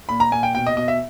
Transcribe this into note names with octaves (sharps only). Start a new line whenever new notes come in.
A#2 B5
A#5
A#2 G#5
G5
B2 G5
D#5
B2 D#5
E5